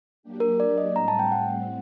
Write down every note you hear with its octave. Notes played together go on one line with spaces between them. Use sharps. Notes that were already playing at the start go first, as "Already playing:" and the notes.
F#3 A#3 D4 G4
A#4
D5
D#5
A2 G3 C4 A#5
A5
G5
F#5